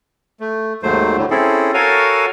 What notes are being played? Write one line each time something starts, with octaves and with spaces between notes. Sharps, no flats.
A3
D#2 G#2 F#3 A3 C5
A2 D3
C4 C#4 E4 G#4 A4
F#4 A4 A#4 C#5 F5 G#5